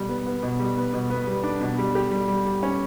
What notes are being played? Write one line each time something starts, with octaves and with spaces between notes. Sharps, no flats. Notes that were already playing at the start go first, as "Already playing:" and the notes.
Already playing: B2 G3
B3
B3
B2
G3
B3
B2
B3
G3
D4
B2
G3
G4
G3
G3
G3
C#4